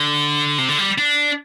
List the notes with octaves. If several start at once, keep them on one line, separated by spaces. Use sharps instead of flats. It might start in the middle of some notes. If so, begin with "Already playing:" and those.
Already playing: D3
C3
D3
G3
D4